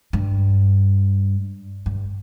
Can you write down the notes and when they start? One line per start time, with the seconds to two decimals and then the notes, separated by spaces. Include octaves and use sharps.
0.13 G2
1.86 G2